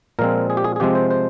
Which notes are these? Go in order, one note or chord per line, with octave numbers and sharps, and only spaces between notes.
A#2 F3 G#3 C4 A#4
G#4
G4
G#4
G#4
C3 F3 G#3 C4 G4
C5
C5